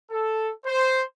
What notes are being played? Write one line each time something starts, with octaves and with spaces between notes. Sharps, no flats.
A4
C5